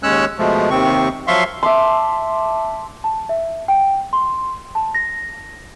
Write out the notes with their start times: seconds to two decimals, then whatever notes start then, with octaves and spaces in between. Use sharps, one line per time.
0.03 D#2 G#3 C#4 C#5 E6 F#6
0.39 B2 F3 G#3 A3
0.70 D#2 C3 D#3 C4 C#6
1.28 F3 F#3 E5 F5 C6 C#6
1.63 E5 A5 C6 D6
3.04 A5
3.29 E5
3.68 G5
4.13 C6
4.75 A5
4.95 A#6